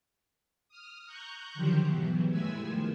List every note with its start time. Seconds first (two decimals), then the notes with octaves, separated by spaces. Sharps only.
0.69 D#6 F6
1.06 A#5 C#6 F#6 G6
1.54 D3 D#3 F3 F#3 G4 C5
1.85 G#2 B2 E3 F#3
2.30 G2 G#3 A3 E4 G#5 E6
2.60 D#3 F3